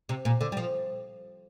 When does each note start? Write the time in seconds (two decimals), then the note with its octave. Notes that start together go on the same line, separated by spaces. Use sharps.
0.09 C3
0.25 A#2
0.41 D3
0.52 G3
0.57 F3